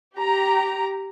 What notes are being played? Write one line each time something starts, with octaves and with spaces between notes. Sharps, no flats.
G4 A#5